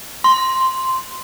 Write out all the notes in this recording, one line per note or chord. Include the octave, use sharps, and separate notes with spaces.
C6